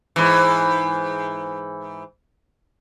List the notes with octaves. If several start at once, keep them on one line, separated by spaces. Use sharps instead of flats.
G#2 E3